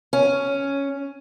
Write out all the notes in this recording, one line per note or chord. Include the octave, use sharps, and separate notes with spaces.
C#4